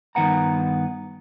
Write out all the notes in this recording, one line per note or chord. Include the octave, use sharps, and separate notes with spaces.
G2 D#3 B3 F#5 A#5